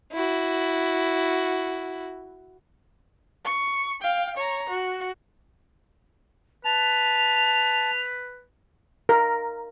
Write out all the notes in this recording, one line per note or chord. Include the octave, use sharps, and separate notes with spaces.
E4 F#4
C#6
F5 G5
C#5 A#5
F#4
B4 A5 F7
A#4